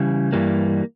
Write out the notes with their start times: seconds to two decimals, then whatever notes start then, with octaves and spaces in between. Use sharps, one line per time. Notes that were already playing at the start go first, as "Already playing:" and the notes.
Already playing: C#3 E3 G3
0.32 G2 E3 G3 A#3